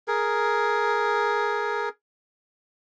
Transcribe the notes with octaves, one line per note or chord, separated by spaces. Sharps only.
G#4 A#4